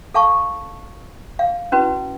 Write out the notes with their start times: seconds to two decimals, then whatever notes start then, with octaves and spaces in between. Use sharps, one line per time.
0.14 A4 F5 A5 C#6
1.39 F5
1.72 C#4 E4 F#4 B4